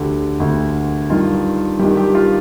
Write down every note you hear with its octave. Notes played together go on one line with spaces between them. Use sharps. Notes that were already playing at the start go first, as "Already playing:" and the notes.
Already playing: D2 D3 G4
D2 D3
G2 D#3 F4
G2 D#3 G4
G4
F4